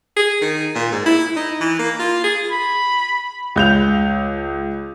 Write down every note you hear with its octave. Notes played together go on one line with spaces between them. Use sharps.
G#4
D#3
A#2
G#2
E4
D#4
E3
A#3
F4
G#4
B5
C#2 G6 F7